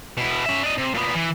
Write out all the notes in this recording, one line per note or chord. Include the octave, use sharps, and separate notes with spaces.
B2 E4
C#4 E5
D4 D#5
C3
A#2 B3
E3